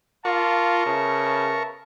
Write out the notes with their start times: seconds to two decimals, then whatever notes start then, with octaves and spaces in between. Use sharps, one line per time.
0.25 F4 A#4 D5 F5 A5 C#6
0.86 C#3 B3 E5 A5